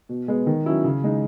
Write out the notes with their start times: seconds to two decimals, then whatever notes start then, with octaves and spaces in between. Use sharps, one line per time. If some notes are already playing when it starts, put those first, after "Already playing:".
0.09 B2
0.28 G#3 B3
0.47 D#3
0.66 F#3 C#4 E4
0.84 C#3
1.04 G#3 D#4